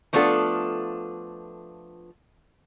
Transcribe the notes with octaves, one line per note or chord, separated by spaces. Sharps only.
F3 A3 B3 D4 F4 A4